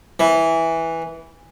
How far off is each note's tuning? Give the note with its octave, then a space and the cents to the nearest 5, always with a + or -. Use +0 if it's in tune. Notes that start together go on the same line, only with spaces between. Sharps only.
E3 -5